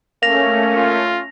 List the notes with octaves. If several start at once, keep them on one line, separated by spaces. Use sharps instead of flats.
A3 A#3 C#4 A#6 F7
F4